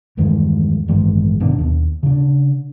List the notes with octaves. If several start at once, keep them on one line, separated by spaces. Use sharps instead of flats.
E2 G2 D#3 G#3
A1 G2 D#3 G#3
G1 B2 D#3 D4
D#2
C#3 D4